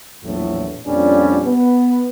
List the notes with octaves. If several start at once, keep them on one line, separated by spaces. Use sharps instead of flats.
A#1 E2 A2 F#3
F2 A#2 G3 C#4 D4
B3